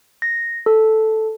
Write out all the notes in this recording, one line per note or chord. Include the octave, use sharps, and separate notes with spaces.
A#6
A4